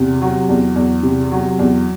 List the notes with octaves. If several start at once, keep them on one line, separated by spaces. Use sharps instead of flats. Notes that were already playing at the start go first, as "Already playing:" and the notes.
Already playing: E2 C3
F#3
E2
E2
C3
F#3
E2